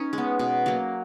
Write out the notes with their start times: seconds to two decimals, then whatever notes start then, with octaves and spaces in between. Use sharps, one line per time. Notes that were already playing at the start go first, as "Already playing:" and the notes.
Already playing: C#4 D#4
0.13 G#3
0.18 B3
0.39 B2
0.66 F#3 A#3